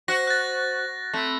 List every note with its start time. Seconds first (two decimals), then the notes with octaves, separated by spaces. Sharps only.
0.08 F#4 C5 A#6
0.27 F#6 A6
1.14 A3 C4 B5 E6